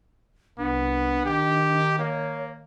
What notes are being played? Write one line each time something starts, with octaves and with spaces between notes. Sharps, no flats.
C2 B3 D4
D#3 G4
A#3 C#5